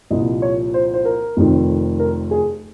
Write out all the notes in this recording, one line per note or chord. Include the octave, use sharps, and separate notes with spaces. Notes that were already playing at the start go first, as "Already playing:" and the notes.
C2 A#2 F3 D#5
C#5
C5
C5
A#4
F1 F2 D#3
A#4
G#4